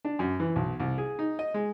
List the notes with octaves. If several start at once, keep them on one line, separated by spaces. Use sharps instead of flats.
D4
F#2
E3
B1
C2
G#4
D#4
D#5
G#3